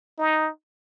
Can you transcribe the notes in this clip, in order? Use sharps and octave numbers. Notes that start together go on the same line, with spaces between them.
D#4